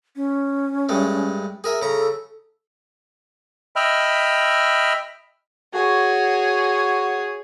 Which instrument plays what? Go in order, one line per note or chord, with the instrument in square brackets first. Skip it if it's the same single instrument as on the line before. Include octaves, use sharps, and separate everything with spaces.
[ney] C#4
[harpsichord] G2 G#3 A3
G#4 A#4 E5
[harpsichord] C#3 A#5 [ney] A4
[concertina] D#5 E5 G5 B5 F6
[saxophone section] F#4 [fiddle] G#4 C#5